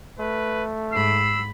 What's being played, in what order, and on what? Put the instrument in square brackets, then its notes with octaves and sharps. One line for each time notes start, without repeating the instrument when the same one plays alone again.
[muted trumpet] A3 [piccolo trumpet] B4
[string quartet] G#2 B5 [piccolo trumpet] E6 [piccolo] C7